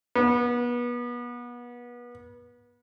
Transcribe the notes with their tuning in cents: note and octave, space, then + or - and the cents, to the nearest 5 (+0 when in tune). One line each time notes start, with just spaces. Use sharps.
B3 -30